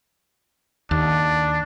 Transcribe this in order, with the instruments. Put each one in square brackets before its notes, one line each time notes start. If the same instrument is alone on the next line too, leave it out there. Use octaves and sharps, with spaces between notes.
[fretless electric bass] D#2 [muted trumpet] D4